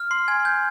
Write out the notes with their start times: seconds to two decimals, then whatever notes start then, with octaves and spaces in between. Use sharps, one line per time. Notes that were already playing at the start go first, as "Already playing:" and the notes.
Already playing: F6
0.11 C6 C7
0.28 G#5 G#6
0.45 G#5 G6